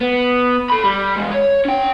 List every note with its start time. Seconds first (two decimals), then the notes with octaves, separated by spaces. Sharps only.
0.01 B3
0.70 A4 B5
0.84 G3
1.16 E2 G#3
1.31 C#5
1.65 C#4 G5